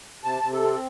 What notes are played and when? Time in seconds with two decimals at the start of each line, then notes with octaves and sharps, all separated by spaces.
0.23 C3 A5
0.43 C3
0.53 A4
0.63 C4